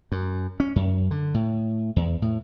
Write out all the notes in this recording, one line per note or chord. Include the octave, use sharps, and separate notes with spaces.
F#2
C#4
F#2
D3
A2
E2
A2